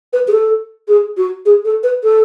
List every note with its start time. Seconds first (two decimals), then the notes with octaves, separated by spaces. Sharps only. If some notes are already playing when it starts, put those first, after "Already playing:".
0.13 B4
0.27 G#4
0.32 A4
0.88 G#4
1.17 F#4
1.45 G#4
1.65 A4
1.83 B4
2.03 A4